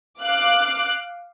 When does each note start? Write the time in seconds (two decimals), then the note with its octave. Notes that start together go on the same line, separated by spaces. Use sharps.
0.22 F5 D6 F#6